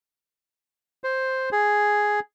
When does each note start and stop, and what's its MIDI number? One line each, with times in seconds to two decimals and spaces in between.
1.04 1.49 72
1.52 2.20 68